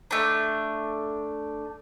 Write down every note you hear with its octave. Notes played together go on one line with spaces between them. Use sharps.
A3 D4